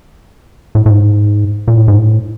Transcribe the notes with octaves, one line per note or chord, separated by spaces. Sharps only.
A2
A2
G#2
A#2
A2
G#2
A2